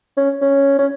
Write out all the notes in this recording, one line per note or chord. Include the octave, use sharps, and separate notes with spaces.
C#4
C#4
C#4